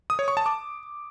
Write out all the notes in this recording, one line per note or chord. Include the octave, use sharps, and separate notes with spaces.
D#6
C#5
C#6
A5
D6